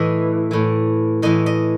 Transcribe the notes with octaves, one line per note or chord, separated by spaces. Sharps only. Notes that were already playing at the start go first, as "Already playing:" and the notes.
Already playing: A2 E3 D#5
A2 E3
A2 E3 D#5
D#5